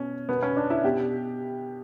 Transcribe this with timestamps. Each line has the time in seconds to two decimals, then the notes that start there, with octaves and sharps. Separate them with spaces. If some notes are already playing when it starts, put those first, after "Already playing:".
Already playing: B2 C#4
0.29 B2 B3
0.43 C#4
0.57 D4
0.70 E4
0.84 B2 G4